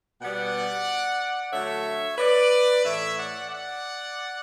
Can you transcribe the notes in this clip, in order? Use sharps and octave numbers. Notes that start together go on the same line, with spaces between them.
B2 G3 B3 D5 F#5
D3 F#3 A3 C#5 E5
B4 D5
A2 E3 A3 C#5 E5
D5 F#5
D5 F#5